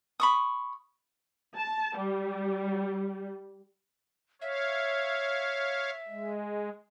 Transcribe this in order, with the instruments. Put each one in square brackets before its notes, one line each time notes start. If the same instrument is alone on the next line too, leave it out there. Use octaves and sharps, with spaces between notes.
[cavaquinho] B5 C#6 D#6
[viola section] A5
G3
[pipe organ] C#5 F5 [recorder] E5
[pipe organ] G#3